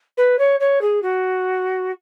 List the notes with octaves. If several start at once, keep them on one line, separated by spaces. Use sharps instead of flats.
B4
C#5
C#5
G#4
F#4